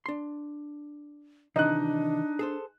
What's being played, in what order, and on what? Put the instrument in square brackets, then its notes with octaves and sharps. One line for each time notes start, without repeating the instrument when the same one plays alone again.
[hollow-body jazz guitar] D4 C6
[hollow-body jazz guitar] C3 D#3 E3 [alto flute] D4 [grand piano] D#4 D#5 F#6
[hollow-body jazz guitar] G#4 A4 C5